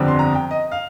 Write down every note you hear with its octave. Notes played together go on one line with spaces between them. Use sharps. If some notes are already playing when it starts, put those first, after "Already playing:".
Already playing: G1 F2 D3 G3 C4
C6
A#5
G5
D#5
F5